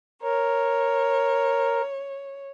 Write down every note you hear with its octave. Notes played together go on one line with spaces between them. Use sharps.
A#4 C#5